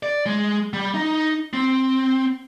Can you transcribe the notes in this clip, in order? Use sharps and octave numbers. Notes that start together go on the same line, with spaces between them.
D5
G#3
G3
D#4
C4